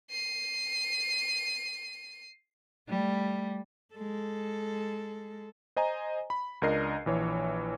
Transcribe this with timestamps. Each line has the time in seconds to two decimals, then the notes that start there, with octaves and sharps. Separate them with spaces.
0.10 C7 D#7
2.89 G3 A3
3.94 G#3 A4
5.76 C5 D#5 G#5 A#5
6.30 B5
6.62 C#2 D4 A#4 D#5 C7
7.06 A#1 E3 C#5